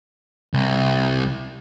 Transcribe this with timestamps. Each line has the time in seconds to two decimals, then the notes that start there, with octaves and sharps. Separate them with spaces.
0.54 C2